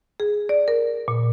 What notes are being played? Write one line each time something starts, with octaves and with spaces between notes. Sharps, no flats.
G#4
D5
A#4
A#2